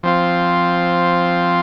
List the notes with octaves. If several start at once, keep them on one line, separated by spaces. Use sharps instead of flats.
F3 C4 F4